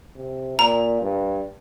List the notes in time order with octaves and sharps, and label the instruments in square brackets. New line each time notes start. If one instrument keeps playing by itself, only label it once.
[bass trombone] C3
[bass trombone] A#2 [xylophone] A#5
[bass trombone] G2